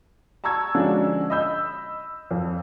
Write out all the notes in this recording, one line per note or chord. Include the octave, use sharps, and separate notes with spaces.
A5 A#5 C#6 E6 G#6
D3 F3 G#3 C#4 D4 F#4
D#5 B5 E6 G6
F2